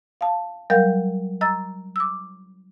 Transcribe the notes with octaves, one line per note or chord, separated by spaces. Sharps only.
F5 A5
F#3 G3 A#4 D#5 F5 G6
D#5 A#5 E6 A6
D6 E6